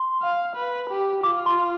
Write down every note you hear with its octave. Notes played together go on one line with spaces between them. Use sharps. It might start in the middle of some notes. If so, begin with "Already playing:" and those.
Already playing: C6
F5
B4
G4
F4 D6
C6